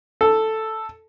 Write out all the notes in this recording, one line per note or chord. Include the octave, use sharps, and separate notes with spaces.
A4